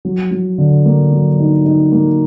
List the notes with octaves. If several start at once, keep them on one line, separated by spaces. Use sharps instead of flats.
F#3
F#3
D3
A#3
F#3
D#4
D#4
A#3